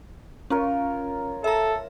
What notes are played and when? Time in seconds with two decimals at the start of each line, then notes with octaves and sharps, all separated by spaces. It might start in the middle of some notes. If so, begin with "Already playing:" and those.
0.50 C#4 F4 A#4 C#5
1.44 A4 E5 A#5